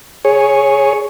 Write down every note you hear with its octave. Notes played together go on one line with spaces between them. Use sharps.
G#4 C#5